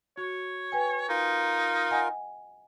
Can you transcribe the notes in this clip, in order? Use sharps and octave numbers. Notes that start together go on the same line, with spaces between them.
F#4 C#5
B4 G5 G#5
D#4 F4 A#4
D#5 F#5 G#5